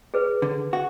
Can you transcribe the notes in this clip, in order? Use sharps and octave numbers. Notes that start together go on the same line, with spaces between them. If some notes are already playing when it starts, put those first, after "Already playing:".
G#4 B4
D3
F#4